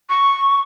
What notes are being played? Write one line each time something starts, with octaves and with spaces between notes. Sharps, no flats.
C#6